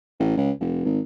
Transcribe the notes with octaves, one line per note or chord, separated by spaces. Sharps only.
A1
C#2
F1
G#1